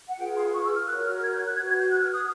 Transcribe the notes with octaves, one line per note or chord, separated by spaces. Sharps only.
F#5
F4 G#4 B4 G5
C6
C#6
E6
F6
F#4 A#4 C#5 F#6
F6
G#6
G6
F#6
F#4 B4 G#6
G#6
G6
F#6
F6
D#6